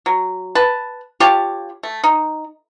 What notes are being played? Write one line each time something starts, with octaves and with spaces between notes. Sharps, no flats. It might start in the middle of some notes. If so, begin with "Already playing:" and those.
F#3
B4 A5
F4 G4 C#5 A5
A3
D#4